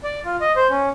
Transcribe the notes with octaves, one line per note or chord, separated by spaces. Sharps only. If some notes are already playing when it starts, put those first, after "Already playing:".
D5
F4
D#5
C5
C#4